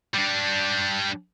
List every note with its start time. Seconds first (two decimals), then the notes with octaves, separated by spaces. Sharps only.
0.14 G3 D4